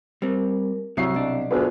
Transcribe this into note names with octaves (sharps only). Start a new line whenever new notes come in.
G3 C4 A#4
C2 F#3 G3 C#6 E6 C7
B1 D4 D#5
D2 B3 F4 G#4 A4